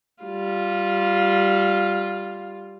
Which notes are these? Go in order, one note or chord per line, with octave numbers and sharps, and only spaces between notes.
G3 F4